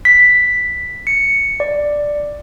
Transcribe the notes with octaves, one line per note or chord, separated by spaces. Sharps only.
B6
C#7
D5